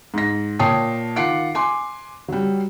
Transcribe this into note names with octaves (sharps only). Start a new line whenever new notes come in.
G#2 A#6
A#2 C#5 G5 A5 D#6 C7
D#3 F4 F#5 D6 C7 D7
G#5 C6 D6
F#3 G3